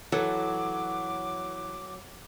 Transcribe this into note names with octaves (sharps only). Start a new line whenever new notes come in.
E3 F#3 A4 D6